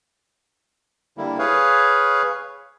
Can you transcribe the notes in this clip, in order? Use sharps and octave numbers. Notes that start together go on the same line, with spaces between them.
D3 G3 A#3 E4
G#4 B4 C#5 F5